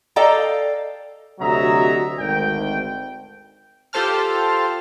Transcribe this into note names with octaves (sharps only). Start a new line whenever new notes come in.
A4 D5 D#5 F5 G5 A#5
D2 C3 F#3 D#5 E5 A#5
G#1 D2 G5
F4 G4 A4 C5 A5 F6